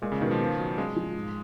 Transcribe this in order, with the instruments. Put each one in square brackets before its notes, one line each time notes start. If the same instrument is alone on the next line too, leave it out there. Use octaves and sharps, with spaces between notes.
[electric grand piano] A#2 [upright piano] G#3
[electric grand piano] C#3
[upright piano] B2 [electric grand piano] D#3
[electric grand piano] F3
[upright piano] B3
F#3
[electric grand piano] G#3 [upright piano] C#4
[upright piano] F3
G#2